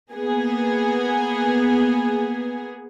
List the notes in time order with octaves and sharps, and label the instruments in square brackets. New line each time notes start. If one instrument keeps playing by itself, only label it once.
[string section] A#3 B3 G#4